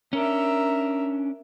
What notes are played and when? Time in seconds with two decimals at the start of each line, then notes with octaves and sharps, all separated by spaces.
0.13 C#4 D4 A#4 E5